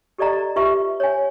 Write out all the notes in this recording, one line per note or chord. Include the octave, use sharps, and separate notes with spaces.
G4 A4 D5 D#5 A#5
F4 G4 B4 E5 C#6 D6
C#5 G#5